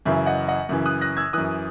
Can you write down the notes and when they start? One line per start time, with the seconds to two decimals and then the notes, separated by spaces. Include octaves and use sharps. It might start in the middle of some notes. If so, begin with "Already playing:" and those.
0.05 F#2 C#3 E3 E5
0.26 D#5 F#5
0.48 D#5 F#5
0.69 F#2 C#3 E3
0.86 D#6 F#6
1.01 F#6 A#6
1.17 E6 G#6
1.33 F#2 E3 D#6 F#6